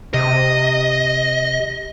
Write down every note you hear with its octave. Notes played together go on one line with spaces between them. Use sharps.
C3 D#5